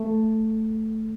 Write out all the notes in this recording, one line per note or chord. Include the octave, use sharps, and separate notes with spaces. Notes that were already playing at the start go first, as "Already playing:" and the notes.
Already playing: A3